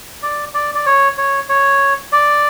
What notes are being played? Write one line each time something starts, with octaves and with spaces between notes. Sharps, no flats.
D5
D5
D5
C#5
C#5
C#5
D5